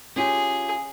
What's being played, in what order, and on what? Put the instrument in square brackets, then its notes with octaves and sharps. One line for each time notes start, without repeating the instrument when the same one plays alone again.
[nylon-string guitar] C#4 F4 G4 [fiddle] G#4